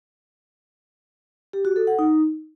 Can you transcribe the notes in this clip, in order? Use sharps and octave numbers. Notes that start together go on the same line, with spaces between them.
G4
F#4
A4
F#5
D#4